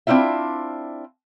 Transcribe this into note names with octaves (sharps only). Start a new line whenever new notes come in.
C4 D4 E4 F4 E5